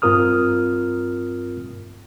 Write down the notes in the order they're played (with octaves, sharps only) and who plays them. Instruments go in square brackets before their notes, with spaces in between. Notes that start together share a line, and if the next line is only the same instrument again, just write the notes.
[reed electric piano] G2 C4 F4 A#4 D#6 F6